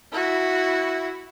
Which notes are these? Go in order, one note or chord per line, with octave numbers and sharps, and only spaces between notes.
E4 F#4